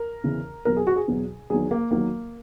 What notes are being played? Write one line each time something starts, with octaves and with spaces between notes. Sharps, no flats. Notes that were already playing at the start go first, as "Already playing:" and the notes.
Already playing: A#4
E2 C#3 E3
E2 B2 F#3 A#4
G#4
F#4
G#4
E2 B2 F#3
E2 D#3 F#3 G#4
A#3
E2 D#3 F#3 A#3